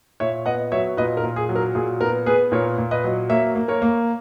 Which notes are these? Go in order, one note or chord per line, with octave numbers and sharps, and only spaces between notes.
A#2 C#5 E5
B3 D#5 F#5
F#3 C#5 E5
A#2 B4 D#5
A#4
A#2
G#4
F#3
A#4
A#2 G#4
B3 A#4
B3 G#4 B4
A#2 A#4 C#5
A#2
B4 D#5
F#3
A#3 C#5 E5
A#3
A#4 C#5
A#3